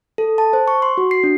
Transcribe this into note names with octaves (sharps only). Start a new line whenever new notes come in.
A4
A5
C5
C#6
C6
F#4
C7
D4